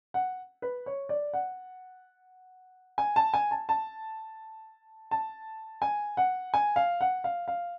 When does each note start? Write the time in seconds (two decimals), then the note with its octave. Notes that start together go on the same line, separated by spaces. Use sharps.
0.14 F#5
0.62 B4
0.86 C#5
1.09 D5
1.33 F#5
2.98 G#5
3.16 A5
3.34 G#5
3.51 A5
3.69 A5
5.11 A5
5.82 G#5
6.17 F#5
6.54 G#5
6.76 F5
7.01 F#5
7.24 F5
7.48 F5